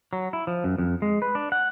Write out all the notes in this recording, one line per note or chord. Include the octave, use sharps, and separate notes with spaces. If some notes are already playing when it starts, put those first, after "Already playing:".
F#3
E4
F3
F#2
F2
G#3
B4
D4
F#5